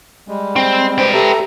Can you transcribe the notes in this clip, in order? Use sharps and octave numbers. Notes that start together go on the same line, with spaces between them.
G3 G#3
C4
B4 C5 G5
G4 A4 E5 A#5